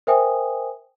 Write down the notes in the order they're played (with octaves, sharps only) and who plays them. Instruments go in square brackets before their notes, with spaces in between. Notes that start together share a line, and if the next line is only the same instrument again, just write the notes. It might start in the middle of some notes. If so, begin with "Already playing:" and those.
[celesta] A#4 C5 E5 G5 G#5 D#6